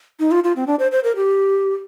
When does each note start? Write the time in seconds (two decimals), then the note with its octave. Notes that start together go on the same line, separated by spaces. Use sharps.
0.20 D#4
0.31 F4
0.44 F4
0.56 C4
0.67 D4
0.79 C5
0.92 C5
1.04 A#4
1.16 G4